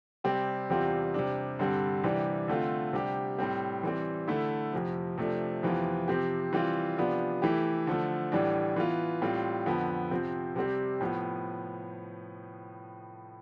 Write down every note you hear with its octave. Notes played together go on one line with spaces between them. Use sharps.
C3 G3 C4 G4
E2 C3 G3 C4 F4
C3 G3 D4
G2 D3 G3 C4
C3 E3 G3 D4 G4
D3 A3 C4 F4
C3 G3 D4 G4
A2 G3 C4
E3 G3 C4
D3 A3 E4
F2 C3 F3
C3 F3 A3 D4
F2 C3 E3 B3 F4
C3 F3 C4 G4
E3 G3 C4 F4
C3 F3 B3 D4 F4
E3 A3 E4 G4
D3 F3 A3
A2 E3 G3 D4
E3 B3 F4
A2 G3 C4 F4
F2 D3 F3 B3
C3 F3 C4
C3 G3 C4 G4
A2 F3 B3